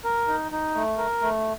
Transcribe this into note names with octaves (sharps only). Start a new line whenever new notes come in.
A#4
D#4
D#4
A3
A#4
A3